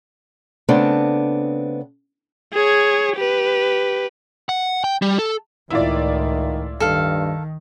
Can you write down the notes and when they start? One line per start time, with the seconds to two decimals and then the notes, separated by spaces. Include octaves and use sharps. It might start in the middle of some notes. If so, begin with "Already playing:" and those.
0.69 C#3 A3 B3 C4 D4
2.53 G#4 C#5
3.16 G4 B4
4.49 F#5
4.84 G5
5.02 G3
5.19 A4
5.70 C#2 A2 D#3 E4 F4 D5
6.80 G2 D#3 A4 F5